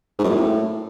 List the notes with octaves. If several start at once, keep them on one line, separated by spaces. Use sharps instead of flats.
G#2
F#2
A#2
A2